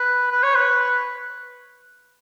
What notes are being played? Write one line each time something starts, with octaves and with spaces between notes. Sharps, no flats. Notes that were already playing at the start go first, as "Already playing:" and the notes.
Already playing: B4
B4
C#5
B4